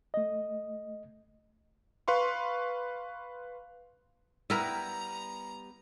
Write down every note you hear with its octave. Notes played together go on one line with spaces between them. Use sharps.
A3 D#5
B4 F5 C6 C#6
G3 B3 E4 A#4 B4 A#5